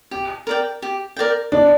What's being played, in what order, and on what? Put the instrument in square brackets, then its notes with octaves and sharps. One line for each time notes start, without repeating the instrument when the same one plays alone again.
[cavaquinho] G4
A#4 D5 G5
G4
A#4 D5 G5
[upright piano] D4 [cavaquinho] D5